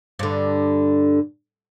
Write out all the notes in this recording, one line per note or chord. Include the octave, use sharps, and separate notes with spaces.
G2 D3